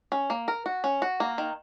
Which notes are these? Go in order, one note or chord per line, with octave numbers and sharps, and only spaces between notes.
C#4
A#3
A#4
F#4
C#4
F#4
A#3
D#3